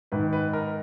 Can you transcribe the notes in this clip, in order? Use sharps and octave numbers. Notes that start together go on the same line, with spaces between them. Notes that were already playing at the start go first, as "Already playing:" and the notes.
G#2 D#3 B4
B4
A#4